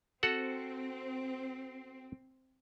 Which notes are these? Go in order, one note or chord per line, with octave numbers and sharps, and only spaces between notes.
C4 F#4 A4 F#5